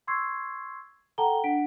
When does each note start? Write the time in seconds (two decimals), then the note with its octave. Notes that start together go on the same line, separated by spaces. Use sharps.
0.07 C6 C#6 E6 G#6 C7
1.18 A4 F#5 G5 A5 A#5 G7
1.44 D4 F#5 B6 D7